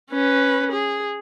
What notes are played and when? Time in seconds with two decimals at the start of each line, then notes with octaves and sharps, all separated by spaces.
0.11 C#4 B4
0.72 G#4